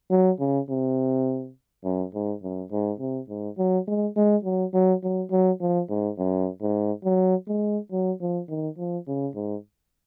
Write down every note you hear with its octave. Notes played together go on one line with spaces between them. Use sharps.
F#3
C#3
C3
F#2
G#2
F#2
G#2
C3
G#2
F#3
G#3
G#3
F#3
F#3
F#3
F#3
F3
G#2
F#2
G#2
F#3
G#3
F#3
F3
D#3
F3
C#3
G#2